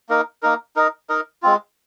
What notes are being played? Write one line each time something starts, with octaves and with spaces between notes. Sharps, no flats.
A#3 D#4 A#4
A#3 D#4 A#4
D#4 A#4 D#5
D#4 A#4 D#5
G#3 C4 F4